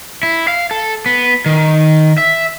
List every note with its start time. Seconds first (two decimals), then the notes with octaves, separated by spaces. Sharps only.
0.23 E4
0.48 F5
0.71 A4
1.06 B3
1.46 D#3
2.18 E5